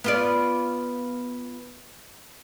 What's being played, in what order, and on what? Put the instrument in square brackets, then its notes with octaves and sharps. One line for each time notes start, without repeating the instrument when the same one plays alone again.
[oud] B3 F4 D5